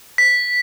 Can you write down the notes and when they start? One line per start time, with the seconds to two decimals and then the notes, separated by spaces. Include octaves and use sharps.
0.18 B6